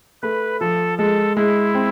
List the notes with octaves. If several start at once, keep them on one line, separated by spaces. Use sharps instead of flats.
A3 B4
F3 A4
G#3 A4
G#3 E4
C4